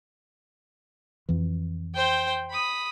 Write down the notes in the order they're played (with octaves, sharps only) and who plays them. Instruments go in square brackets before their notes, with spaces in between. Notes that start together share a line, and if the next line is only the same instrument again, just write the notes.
[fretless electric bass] F2 E3
[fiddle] C5 G5
B5 D#6